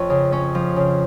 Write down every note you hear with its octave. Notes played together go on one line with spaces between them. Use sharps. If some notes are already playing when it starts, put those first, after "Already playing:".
Already playing: F2 C#4
C#3
C#4
F3
C#3